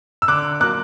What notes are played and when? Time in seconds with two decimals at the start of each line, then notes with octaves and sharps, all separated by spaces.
0.22 E6
0.28 D3 D6 F#6
0.60 F#3 A#3 D6 F#6